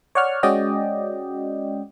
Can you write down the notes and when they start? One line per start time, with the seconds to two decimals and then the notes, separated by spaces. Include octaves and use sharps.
0.15 C#5 D5 F#5 C#6 F6
0.43 G#3 C#4 F#4 D5 D#5 G5